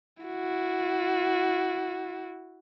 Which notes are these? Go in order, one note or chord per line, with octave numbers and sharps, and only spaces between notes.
E4 F#4